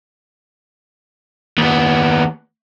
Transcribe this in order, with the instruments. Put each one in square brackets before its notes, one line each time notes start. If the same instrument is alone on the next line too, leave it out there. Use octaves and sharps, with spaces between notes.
[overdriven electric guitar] D#2 B3